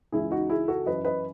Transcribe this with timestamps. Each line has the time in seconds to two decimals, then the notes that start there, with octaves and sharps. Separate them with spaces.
0.12 C#2 C#3 E3 E4 G#4
0.31 D#4 F#4
0.50 E4 G#4
0.68 F#4 A4
0.86 F#2 E3 B4 D#5
1.05 B4 D#5